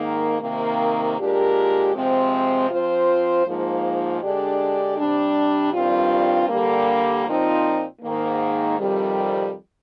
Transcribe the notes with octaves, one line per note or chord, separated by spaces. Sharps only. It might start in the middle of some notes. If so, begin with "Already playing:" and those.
Already playing: G#2 D#3 A#3
C3 D#3 A#3
A#2 G#3 D4 G4 A#4
C3 F3 G#3 C4
F3 C4 F4 C5
G#2 F3 A#3
D3 G#3 D4 G4 D5
C3 G3 D4
G2 D#3 G3 C4 F4
D3 G3 A#3
A#2 F3 C4 D#4
G#2 D#3 A#3
F2 C3 D#3 G3